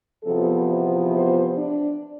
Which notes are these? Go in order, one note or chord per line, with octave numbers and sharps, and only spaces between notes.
E2 C3 F3 B3 A4
C5
C5
D4